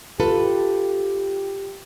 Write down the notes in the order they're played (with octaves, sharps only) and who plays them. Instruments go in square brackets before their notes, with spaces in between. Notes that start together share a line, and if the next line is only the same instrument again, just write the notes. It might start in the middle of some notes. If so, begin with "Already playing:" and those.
[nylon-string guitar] F4 A4 B4 [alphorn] G4